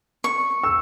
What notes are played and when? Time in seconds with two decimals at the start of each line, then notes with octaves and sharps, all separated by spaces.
0.24 C#6
0.63 E6